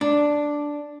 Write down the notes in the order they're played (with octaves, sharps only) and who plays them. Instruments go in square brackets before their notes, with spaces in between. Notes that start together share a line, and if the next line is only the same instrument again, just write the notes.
[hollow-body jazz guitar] D4